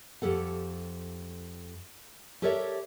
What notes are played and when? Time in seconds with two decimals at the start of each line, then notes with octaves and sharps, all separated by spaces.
0.22 F2 G4 A4 F#5
2.42 G4 A4 A#4 C#5 D5 E5